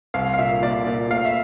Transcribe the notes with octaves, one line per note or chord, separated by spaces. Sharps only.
C2 F5
F5
A#2 E5
A#2 D5
A#2
A3 F5
E5